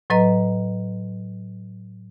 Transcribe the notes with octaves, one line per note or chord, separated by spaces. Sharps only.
A2 F#3 B4 D#5 A#5